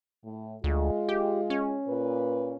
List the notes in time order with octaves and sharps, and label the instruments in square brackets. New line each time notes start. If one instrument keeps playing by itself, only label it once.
[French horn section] A2
[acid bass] D2 [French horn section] G#3 F4
[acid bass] G4
C#4
[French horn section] A#2 B4